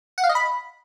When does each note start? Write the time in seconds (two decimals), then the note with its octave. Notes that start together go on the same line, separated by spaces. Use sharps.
0.18 F#5
0.24 F5
0.29 D#5
0.35 B5